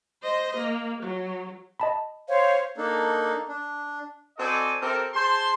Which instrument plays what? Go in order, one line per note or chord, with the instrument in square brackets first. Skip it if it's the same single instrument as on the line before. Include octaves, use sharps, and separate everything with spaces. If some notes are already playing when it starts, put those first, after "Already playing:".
[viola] C5 D#5
A#3
F#3
[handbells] D#5 A5 B5
[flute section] C5 F5 [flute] C#5
[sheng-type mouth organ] A#3 D4 D#4 A4
D4
[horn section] C4 F#4 A4 D5 D#5 G#5
C4 G4 A4 A#4
G#4 C5 A5 C6